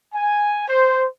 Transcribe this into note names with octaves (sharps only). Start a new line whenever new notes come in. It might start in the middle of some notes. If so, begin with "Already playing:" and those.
G#5
C5